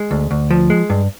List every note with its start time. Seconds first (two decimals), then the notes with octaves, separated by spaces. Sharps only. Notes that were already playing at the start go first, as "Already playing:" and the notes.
Already playing: G#3
0.11 D2
0.31 D2
0.50 F3
0.70 G#3
0.90 G2